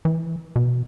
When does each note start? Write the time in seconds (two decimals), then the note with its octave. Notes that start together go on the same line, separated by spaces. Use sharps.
0.05 E3
0.56 B2